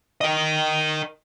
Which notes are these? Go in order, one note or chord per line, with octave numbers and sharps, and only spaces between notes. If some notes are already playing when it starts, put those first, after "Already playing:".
A#4 D#5